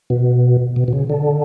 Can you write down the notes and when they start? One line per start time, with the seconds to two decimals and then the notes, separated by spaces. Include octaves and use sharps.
0.10 B2
0.76 B2
0.88 B2
0.93 C#3
1.09 D3